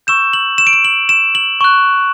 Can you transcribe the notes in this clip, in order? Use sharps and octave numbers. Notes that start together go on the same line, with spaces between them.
C#6 E6 G6 E7
F#7
E7
D7
E7
F#7
E7
F#7
C#6 F#6